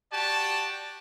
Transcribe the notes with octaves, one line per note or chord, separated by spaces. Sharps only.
F#4 G4 D5 A5